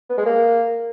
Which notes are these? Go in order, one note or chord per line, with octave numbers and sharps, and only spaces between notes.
B3
G#3
A#3